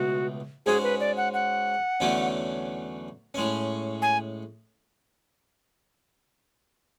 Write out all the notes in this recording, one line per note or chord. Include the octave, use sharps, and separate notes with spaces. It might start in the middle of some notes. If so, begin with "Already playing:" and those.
Already playing: C#2 B2 A3 F#4
G#2 G#3 C#4 F#4 G#4
B4
D5
F#5
F#5
E2 D3 F#3 A3 C#4
A2 G#3 C#4
G#5